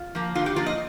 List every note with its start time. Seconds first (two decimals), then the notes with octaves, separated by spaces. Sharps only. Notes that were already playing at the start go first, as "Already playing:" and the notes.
Already playing: F4
0.15 F3 A#3
0.35 D3 F4
0.46 G4
0.56 F3 A#3 F4
0.67 D#5